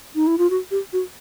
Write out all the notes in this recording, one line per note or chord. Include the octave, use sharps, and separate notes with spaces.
D#4
E4
F4
F#4
G4
F#4